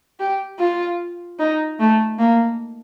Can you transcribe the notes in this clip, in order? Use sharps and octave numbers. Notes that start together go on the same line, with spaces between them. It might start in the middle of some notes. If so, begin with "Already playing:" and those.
G4
F4
D#4
A3
A#3